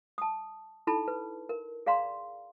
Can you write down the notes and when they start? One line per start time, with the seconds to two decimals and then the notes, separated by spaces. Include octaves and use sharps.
0.18 A5 D#6
0.87 D#4 E4 A4 A5 B5
1.08 B4
1.49 A#4
1.86 G#4 D5 F5 A#5 C6